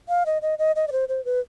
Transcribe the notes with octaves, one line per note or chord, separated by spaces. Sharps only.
F5
D#5
D#5
D#5
D#5
D5
C5
C5
B4